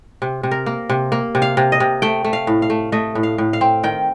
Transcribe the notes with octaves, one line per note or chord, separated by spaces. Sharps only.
C3
C3
A#4
A#3
C3
A#3
C3
F5
C3
D#5
C3
A3 G5
A3
F5
A2
F5
A3
A3 D#5
A2
F5
A2
F5
C4
D#3 G5